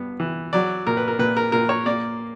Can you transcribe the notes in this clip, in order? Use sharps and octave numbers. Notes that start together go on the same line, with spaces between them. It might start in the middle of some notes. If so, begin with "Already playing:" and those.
Already playing: G2 B3
E3
F#3 D5
A#2 A#4
B4
A#4
A#2 B4
A#4
A#2 A#4
C#5
A#3 D5